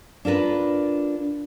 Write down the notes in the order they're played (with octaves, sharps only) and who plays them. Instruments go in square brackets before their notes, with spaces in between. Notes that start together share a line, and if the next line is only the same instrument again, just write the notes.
[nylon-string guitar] D4 F4 A#4 B4